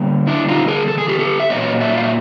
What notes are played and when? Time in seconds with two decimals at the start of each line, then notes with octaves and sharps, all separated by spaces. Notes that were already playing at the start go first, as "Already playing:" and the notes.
Already playing: D3 G3 A#3
0.27 D4 E4
0.48 D#4 F4
0.68 G#4 A#4
0.88 A4
0.98 G#4
1.08 G4 A4
1.19 G4 A4
1.40 E5
1.50 A#2 F#3 A#3 C#5 D#5
1.80 D5 E5
1.98 F5
2.04 E5